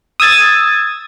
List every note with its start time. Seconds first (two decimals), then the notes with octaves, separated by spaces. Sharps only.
0.20 D#6 E6 G#6 A6